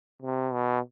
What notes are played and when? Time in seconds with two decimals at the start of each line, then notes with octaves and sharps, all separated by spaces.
0.22 C3
0.53 B2